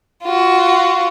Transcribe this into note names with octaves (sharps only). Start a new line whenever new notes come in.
F4 F#4